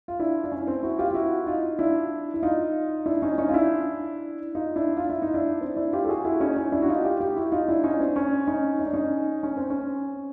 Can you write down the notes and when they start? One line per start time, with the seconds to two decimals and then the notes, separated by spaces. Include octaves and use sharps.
0.08 F4
0.20 D4 E4
0.44 D4
0.52 C#4
0.67 C4
0.83 E4 F#4
0.99 F4 G4
1.09 F4
1.14 E4 F#4
1.47 D#4 F4
1.79 D4 E4
2.34 E4
2.43 D#4 F4
3.06 D4 E4
3.22 C#4 D#4
3.38 C#4 D#4
3.49 F4
3.54 D4 E4
4.55 D#4 F4
4.76 D4 E4
4.97 F4
5.10 E4
5.22 D#4
5.34 D4 E4
5.61 C4
5.77 D4 E4
5.92 F4 G4
6.04 A4
6.09 F#4 G#4
6.25 E4 F#4
6.40 C#4 D#4
6.56 C#4 D#4
6.72 D4 E4
6.82 F#4
6.88 D#4 F4
7.04 F4 G4
7.20 F4 G4
7.36 E4 F#4
7.52 D#4 F4
7.68 D4 E4
7.84 C#4 D#4
8.00 C4 D4
8.16 C#4
8.47 C#4 D#4
8.79 D#4
8.87 D4
8.93 C#4 D#4
9.43 C#4
9.57 C4
9.70 C#4